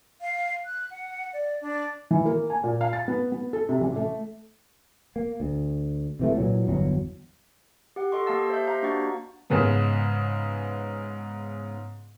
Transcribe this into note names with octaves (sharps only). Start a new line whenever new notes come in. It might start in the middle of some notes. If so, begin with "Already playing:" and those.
F5
F#6
F#5
D5
D4
E3
A#3
G#5
A#2
F5
A6
B3
B3
A4
C3
A1
A3
A#3
D2
C3 E3 A3
A#2 E3 F#3
G1 E2 F#3
G4 F#5
G4 A4 D#5 C6 C#6
A#3 G4 F5 A5 E6 A6
C5 E5 G6
G4 C5 D#5 F5 A#5
A#3 D4 F#4 F#5 C#6 A6
G#2 C#3 G#3 B3